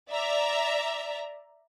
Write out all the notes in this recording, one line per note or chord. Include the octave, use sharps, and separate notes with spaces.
D5 E5 A#5